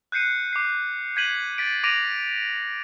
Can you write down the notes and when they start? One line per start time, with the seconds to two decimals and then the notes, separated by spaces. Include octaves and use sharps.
0.12 F#6 G6 C7 C#7 D#7
0.53 D6 C7
1.16 G6 G#6 B6 D#7 F#7
1.58 A6 B6 D7
1.84 D6 A#6 D7 D#7 F7